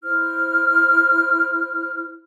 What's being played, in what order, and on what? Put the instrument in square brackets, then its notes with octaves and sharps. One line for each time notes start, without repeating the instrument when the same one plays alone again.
[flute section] E4 C5 F6